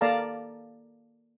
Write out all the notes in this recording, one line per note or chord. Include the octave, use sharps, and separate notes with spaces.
A#3 A4 D5 F5 A5 A#5